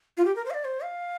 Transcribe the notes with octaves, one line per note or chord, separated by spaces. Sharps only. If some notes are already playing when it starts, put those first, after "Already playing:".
F4
G4
A#4
C5
F5
D5
C5
F5